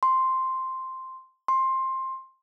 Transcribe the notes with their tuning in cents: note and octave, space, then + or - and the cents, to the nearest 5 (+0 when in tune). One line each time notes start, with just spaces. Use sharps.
C6 +0
C6 +15